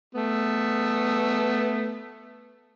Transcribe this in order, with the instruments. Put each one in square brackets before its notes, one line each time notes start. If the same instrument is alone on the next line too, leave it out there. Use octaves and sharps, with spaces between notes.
[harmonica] A3 B3